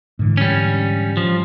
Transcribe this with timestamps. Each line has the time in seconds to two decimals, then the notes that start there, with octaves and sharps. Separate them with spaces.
0.19 G#2 D3 E3
0.37 G3 C#4
1.17 F3